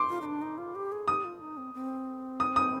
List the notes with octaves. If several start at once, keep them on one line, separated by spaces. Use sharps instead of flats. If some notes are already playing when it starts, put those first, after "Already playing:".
Already playing: C6 D6
F4
D#4
D4
D#4
F4
G4
G#4
G4 D#6
F4
D#4
C4
C4
D#6
D#6